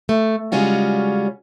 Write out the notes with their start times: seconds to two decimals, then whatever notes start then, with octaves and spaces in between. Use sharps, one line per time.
0.09 A3
0.52 C#3 G3 G#3 C#4 F4 F#4